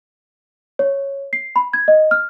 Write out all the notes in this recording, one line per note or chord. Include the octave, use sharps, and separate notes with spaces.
C#5
C7
B5
G#6
D#5
F6